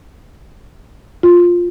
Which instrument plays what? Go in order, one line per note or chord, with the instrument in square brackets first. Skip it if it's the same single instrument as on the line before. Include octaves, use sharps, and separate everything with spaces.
[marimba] F4